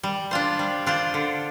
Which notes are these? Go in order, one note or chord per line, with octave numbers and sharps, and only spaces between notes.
G3
D4 F4 C5
G3
D4 F4 C5
D3